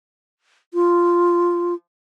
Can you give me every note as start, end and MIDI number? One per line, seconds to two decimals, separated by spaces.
0.74 1.74 65